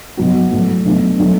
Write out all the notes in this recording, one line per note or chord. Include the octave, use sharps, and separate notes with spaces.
B2 F#3 B3 F#4
A2 F#3 A3
B2 F#3 A3 D4
F#3 A3 D4